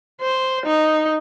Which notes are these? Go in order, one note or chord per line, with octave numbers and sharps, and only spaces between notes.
C5
D#4